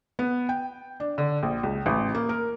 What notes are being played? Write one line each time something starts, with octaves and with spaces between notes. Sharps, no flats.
B3
G5
D4
D3
A#1
C#2
A1
A#3
A#4